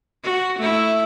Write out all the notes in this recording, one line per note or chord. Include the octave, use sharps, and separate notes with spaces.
F#4
A3 E4